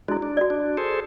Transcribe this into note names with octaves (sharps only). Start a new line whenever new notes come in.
G#3 D4 E4 F#4
D4
F#4 D5
D4
G#4 A4 C5